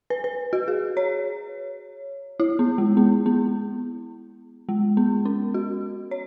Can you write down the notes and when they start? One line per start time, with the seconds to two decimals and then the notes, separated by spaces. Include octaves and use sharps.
0.10 B4
0.24 B4
0.53 F#4
0.68 G#4
0.97 C#5
2.40 E4
2.59 B3
2.78 G#3
2.97 B3
3.26 B3
4.69 G#3
4.97 B3
5.25 C#4
5.54 F#4
6.11 C#5